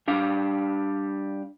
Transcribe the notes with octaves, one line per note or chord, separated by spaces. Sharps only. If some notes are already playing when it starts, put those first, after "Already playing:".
G3 D4 F5